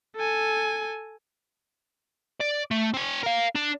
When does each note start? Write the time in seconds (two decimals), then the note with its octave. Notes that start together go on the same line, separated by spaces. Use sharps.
0.16 A4 G#5
2.41 D5
2.71 A3
2.94 C4 G#5
3.23 A#4 F5
3.56 D4